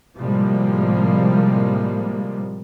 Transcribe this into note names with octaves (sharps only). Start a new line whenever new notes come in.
A2 C3 F3 G3 G#3 A#3